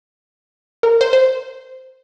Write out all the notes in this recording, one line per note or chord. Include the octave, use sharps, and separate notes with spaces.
A#4
C5
C5